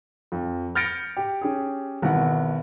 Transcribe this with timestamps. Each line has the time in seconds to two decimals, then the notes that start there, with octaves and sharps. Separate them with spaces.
0.32 F2
0.75 F6 G6 A6 A#6 C#7 D7
1.17 G4
1.41 C#4 G4 G#4
2.02 G#1 B2 E3 F#5